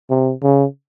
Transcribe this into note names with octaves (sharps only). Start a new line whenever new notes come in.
C3
C#3